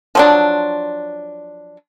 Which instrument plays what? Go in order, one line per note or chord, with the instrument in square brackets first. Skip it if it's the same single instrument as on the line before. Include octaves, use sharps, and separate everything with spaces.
[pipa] F3 F#3 D4